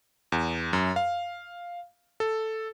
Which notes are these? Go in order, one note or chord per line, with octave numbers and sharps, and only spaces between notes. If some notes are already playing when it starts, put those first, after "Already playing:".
E2
F#2
F5
A4